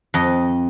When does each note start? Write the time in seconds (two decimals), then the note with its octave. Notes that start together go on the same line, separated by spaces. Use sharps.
0.14 F2 D#5